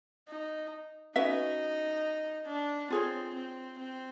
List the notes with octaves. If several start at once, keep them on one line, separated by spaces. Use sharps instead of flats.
D#4
C#4 D#4 F#4 B4 E5
D4
C4 F4 G#4 C#5
C4
C4